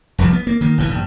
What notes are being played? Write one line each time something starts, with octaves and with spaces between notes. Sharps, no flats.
F1 C2 C3 F3
B3
A#3
D#3 A#3
G#1 B2 E3
A#1 G2